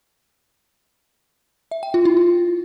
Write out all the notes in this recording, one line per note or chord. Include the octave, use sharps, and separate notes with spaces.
E5
G5
F4
E4
F4